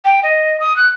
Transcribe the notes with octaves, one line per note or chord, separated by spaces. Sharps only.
G5
D#5
D#6
F#6